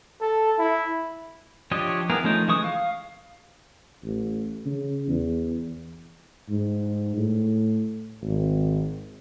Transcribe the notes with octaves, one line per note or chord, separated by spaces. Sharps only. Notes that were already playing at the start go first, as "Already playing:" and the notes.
A4
E4
F3 D4 G4 C#5 D#5
B3 E4 G#4 A#4
F3 A3 C#4 D#4
E3 G#3 C#6 D#6
F5
A1
C#3
E2
G#2
A2
G#1